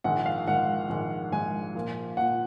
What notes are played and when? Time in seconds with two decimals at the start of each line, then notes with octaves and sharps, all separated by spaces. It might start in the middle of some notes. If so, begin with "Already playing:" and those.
0.04 A#1 G#2 D#3 G#3 F#5
0.26 F5
0.47 A#1 G#2 D#3 G#3 F#5
0.89 A#1 G#2 D#3 G#3
1.32 A#1 G#2 D#3 G#3 G#5
1.75 A#2 F3 A#3 F4
2.17 A#2 F3 A#3 F4 F#5